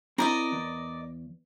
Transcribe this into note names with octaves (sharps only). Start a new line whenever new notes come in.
C4 E4 A#4 D5 D#5 A#5
E2